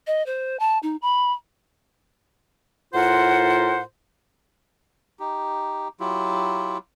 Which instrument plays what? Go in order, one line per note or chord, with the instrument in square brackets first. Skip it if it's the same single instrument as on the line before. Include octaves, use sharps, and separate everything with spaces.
[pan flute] D#5
C5
A5
D#4
B5
[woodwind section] A2 F4 A#4 C5 F#5
[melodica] D#4 G4
F#3 E4 F4 G4